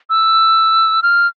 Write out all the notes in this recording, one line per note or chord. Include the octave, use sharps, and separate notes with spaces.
E6
F6